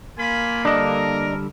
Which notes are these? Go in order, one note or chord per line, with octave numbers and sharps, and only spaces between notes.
A#3 F4 G#5 B5
D3 G3 D4 A4 A#4 D#5